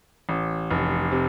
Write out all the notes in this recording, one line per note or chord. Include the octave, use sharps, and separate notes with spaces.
A1
F1
C3